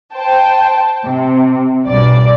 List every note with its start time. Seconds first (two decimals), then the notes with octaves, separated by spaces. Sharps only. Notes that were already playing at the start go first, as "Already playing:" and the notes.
0.14 C5 G5 A5
1.06 C3
1.87 B1 G2 D5